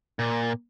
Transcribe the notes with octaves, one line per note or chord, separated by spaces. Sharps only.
A#2